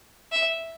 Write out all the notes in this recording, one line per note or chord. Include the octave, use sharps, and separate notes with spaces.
E5